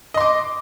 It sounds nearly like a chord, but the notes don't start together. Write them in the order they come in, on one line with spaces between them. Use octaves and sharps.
D#5 C6 D6